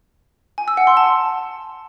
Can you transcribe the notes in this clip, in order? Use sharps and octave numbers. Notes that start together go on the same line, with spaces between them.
G#5
E6
F#5
C6
A5